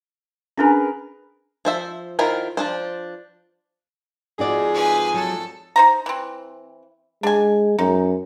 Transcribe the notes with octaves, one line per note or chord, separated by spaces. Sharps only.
C#4 D4 G#4 A#4 B4 G#5
F3 C5 E5
D#3 E4 F4 A#4 C5
F3 D4 C5
F2 G#2 D#4 F#4 G#4 D5
B4 G#5
F#3 A4
D#4 C5 A#5
E3 C4
G#3 D4 G#5
F#2 D#4